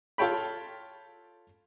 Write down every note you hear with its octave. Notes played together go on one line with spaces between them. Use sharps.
F4 A4 C#5 G5 B5